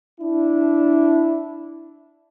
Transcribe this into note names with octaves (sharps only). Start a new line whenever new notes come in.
D4 E4